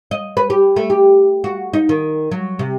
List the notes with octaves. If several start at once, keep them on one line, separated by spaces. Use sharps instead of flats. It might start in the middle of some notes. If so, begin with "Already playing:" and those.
D#5
B4
G4
A3
G4
F#4
D#4
D#3
F#3
C3